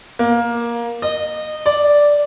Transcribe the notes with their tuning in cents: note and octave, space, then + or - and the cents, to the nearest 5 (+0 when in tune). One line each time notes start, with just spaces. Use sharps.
A#3 +15
D#5 -20
D5 -5